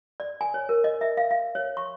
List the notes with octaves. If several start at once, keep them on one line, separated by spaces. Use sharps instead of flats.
D5
G#5
C#5
A#4
D#5
E5
F5
F5
C#5
C#6